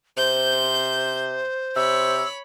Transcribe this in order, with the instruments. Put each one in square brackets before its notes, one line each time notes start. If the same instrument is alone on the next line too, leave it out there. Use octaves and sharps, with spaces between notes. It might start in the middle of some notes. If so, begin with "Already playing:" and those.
[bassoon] C3 [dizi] C5 [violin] G6
[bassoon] C3 [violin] C#5 B5 [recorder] E6